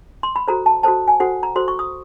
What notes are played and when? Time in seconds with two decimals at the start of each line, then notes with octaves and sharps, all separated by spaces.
0.23 C6
0.36 B5
0.48 F#4 A4 C5 A#5
0.66 A5
0.83 F#4 A4 C5 A5
1.08 G#5
1.20 F#4 A4 C5 F#5
1.43 A#5
1.56 F#4 A4 C5 C6
1.68 C#6
1.79 D#6